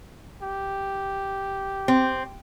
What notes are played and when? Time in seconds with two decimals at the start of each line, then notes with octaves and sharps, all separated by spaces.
0.42 G4
1.88 C4